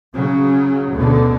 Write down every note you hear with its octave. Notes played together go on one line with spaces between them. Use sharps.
C#3 F#3
D2 B2 D3